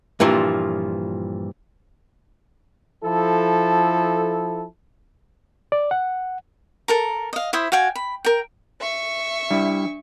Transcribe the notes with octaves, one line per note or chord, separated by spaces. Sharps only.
G2 A#2 E3 F3
F3 E4 A4
D5
F#5
A4 A#4 A#5
D#5 F5
E4 C5 E5 D#6
F#4 F5 G5 G#5
B5
A#4 G5
E5 C#6
G3 D4 E4